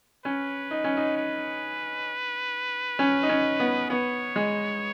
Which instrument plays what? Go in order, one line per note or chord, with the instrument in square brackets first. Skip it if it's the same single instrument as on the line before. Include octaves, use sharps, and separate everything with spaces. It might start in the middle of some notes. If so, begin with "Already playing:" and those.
[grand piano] C#4 [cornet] B4
[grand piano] D#4
C#4
D#4
[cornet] B4
[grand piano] C#4
D#4
C#4
B3
[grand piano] B3 [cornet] C#5
[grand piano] G#3